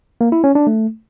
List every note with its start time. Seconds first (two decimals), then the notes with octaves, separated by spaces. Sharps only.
0.21 A#3
0.32 E4
0.44 C#4
0.55 D4
0.67 A3